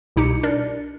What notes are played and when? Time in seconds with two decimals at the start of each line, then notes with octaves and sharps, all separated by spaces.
0.16 C2 B2 D#4 G4 C#7
0.43 D4 A#4 D5